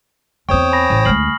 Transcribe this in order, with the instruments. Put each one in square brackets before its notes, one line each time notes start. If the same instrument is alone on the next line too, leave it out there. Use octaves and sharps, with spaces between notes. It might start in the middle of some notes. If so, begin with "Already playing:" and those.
[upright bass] E2 C4 [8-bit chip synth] C5 C#5 G5 [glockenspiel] C#6 D#6
[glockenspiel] G#5 B5 A#6
[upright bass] A1
[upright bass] D2 G#3 [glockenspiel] F6 C7 F#7